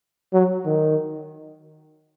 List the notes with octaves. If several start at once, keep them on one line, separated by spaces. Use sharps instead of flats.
F#3
D#3